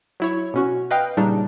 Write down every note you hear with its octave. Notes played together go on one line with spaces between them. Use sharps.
F#3 E4 C#5
B2 C#4 F#4
B4 D#5 F5 G5
A#2 C#3 G3 D4 D#4